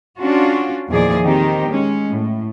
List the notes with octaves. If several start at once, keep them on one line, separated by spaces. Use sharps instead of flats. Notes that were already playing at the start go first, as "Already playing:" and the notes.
C#4 D4 F4 F#4
E2 A#2 D#3 F3 G#4 D5
D#3 C4 D#4 G4
G#3 C#4
A2